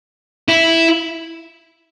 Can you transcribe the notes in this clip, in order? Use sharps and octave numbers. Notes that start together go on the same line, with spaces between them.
E4